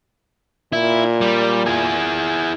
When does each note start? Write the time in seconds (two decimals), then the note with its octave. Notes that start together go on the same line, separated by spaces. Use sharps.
0.73 A#2 E4
1.21 G3
1.66 E4 G#4